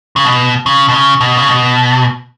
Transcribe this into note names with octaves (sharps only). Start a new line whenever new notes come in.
C#3
B2
C#3
B2
C#3
B2
C#3
B2